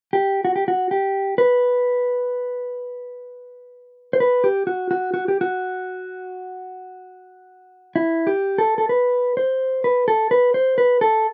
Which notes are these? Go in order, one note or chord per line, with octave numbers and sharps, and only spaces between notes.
G4
F#4
G4
F#4
G4
B4
C5
B4
G4
F#4
F#4
F#4
G4
F#4
E4
G4
A4
A4
B4
C5
B4
A4
B4
C5
B4
A4